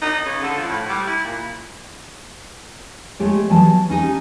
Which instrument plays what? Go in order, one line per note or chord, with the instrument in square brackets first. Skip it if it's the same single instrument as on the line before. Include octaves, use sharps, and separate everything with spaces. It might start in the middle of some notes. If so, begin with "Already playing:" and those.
[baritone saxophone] D#4
C#3
D3
F3
A2
G3
E4
A#2
[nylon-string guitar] G#3 A3 G4 C#5
E3 F#3 B3 A5
C#4 D#4 G4